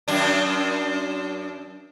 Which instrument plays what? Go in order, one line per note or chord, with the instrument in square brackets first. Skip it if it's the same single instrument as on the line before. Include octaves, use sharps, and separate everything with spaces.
[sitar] F#2 D4